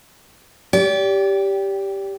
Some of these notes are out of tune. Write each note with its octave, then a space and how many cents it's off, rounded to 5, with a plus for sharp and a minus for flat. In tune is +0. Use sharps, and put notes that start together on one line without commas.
G4 +0 D5 -35